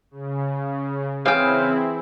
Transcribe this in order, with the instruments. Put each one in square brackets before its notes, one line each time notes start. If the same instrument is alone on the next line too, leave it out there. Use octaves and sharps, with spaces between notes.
[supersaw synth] C#3
[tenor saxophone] C#3 [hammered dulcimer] E3 G#4 [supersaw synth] C4 E4 [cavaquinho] F5 G5